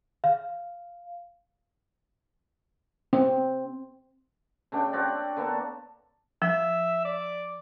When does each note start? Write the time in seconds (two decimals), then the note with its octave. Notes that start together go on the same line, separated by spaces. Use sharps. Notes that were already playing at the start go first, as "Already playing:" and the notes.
0.24 F5
3.13 C4
4.72 C#3 A3 D4 G5
4.93 C4 F#4 D5
5.37 D3 A#3 B3 A4
6.42 F3 E5
7.05 D5